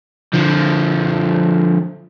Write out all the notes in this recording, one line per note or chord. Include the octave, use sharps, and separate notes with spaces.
D3 F3